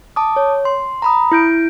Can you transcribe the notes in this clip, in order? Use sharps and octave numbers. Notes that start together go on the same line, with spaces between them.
A5 D6 D#6
C#5
C6
A#5 B5 D#6
E4 G6 D7